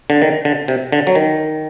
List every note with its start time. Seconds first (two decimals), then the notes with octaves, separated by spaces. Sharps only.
0.10 D3
0.22 D#3
0.45 D3
0.68 C3
0.92 D3
1.07 F#3
1.15 D#3